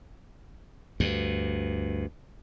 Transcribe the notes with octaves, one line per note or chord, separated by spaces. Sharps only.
D2 G2